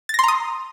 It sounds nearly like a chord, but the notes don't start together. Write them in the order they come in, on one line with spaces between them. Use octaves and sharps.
A6 A#6 C6 A#5 D#6